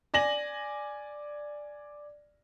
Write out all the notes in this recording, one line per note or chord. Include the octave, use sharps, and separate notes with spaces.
D5 G#5 A#6 F#7